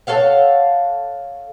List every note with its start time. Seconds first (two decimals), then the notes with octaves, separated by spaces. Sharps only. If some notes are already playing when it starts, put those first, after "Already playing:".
0.07 A4 C#5 F5 F#5